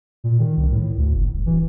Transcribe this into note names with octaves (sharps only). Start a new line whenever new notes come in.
A#2
D#3
C2
A2
D2
F#1
D#1
E3